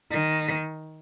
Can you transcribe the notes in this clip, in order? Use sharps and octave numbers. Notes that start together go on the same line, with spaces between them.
D#3